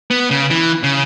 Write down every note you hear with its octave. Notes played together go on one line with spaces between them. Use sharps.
B3
C#3
E3
C#3